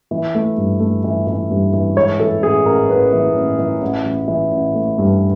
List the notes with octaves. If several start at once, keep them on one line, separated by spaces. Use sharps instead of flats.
E3
A3
G2
A3
E3
E3
G2
E3
G#2 C#5
E3 A4
A1 G#4
A1 A#4
A1 B4
E3
A1
E3
A1
A1
E3
A1
A3
G2